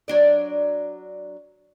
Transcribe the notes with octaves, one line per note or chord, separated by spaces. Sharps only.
F#3 D4 D5